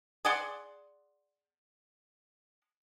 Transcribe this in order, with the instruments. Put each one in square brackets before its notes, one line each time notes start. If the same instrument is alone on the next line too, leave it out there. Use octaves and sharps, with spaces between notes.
[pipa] G#4 D5 F#5 C6